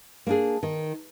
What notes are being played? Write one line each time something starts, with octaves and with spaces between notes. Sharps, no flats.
A#3 D4 G#4
D#3